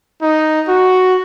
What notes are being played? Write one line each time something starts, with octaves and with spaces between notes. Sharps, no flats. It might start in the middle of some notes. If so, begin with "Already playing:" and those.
D#4
F#4